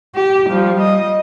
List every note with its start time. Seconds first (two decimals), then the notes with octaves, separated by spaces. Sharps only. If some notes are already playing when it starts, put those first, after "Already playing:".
0.15 G4
0.49 F3 G3
0.79 G3 D#5